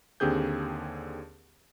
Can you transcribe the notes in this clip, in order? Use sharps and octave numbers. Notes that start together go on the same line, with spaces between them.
D#2 D3 C4 G4 G#4 G6